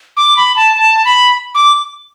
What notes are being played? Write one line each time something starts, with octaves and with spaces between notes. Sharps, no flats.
D6
B5
A5
A5
B5
D6